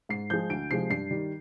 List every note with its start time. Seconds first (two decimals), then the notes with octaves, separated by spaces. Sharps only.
0.09 G#2 C7
0.30 F3 G#3 G6
0.50 D2 D7
0.71 C3 F3 G#3 C7
0.90 G2 C7
1.10 D#3 G3